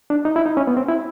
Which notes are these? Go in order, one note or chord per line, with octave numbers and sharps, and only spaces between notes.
D4
D#4
E4
D#4
C#4
B3
C4
E4